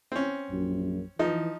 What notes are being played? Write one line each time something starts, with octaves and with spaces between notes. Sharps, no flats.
C4 C#4
A#1 F#2
E3 F3 D#4